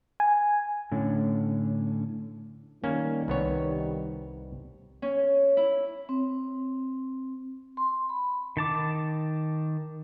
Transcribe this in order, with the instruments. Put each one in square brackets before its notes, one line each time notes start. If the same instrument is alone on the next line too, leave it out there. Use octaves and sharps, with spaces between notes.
[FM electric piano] G#5
[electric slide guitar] A2 D3 C#4
[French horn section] D#3 G3 [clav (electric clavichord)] A#3 C#4
[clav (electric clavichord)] C2 B3 C#5
[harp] C#4
E4
[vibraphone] C4
C6
B5
[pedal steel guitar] D#3 A5 D6